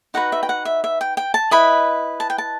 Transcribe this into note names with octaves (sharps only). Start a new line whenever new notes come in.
D#4 F#4 B4 F#5
E5
G5
F#5
E5
E5
G5
G5
A5
E4 B4 D#5 B5
A5
G5
A5